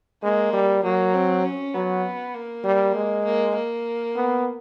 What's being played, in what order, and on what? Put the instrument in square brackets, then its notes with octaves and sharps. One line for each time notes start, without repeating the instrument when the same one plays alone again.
[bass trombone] G#3 [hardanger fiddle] A#3
[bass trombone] G3
[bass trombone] F#3 [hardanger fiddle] A#3
[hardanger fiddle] C4
C#4
[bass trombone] F#3 [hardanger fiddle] B3
[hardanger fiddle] A#3
[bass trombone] G3
G#3
[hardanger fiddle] A#3
A#3
[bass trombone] B3